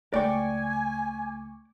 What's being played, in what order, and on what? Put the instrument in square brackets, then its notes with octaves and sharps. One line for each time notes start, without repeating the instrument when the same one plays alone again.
[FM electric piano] C#2 C#6 D6 [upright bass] A3 [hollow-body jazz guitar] D5 G5 [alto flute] G#5